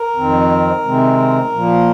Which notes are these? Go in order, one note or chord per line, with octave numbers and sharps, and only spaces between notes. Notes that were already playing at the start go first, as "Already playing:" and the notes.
Already playing: A#4
F2 D#3 C4
C3 D#3 G#3 C4
A#2 F3 A#3